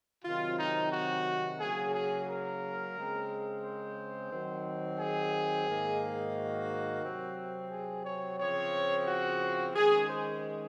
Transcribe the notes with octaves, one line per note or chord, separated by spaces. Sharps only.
C3 D#3 F#3 C4 F4
D#4
F#4
C#3 F#3 A#3 G#4
G#4
A#4
C#3 G#3 C4
C5
D#3 F#3 C4
G#4
G#2 D#3 A#3
F#4
C3 F#3 C4
G#4
C#5
C#3 F3 C4 C#5
F#4
D#3 G#3 C#4 G#4
C5